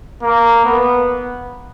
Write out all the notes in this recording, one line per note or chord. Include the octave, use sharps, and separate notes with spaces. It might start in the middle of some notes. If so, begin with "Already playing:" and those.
A#3
B3